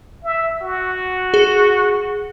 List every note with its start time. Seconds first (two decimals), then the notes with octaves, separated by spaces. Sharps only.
0.24 E5
0.62 F#4
1.34 G#4